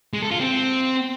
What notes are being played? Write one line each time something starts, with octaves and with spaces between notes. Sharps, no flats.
G#3
A4
F4
C4